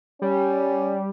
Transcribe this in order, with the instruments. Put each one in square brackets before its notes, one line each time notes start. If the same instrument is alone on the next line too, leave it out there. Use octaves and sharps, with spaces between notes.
[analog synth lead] G3 [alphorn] C#4